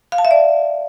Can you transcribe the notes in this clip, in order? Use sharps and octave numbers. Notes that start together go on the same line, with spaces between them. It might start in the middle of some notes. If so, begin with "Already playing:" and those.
F5
A5
E5
D5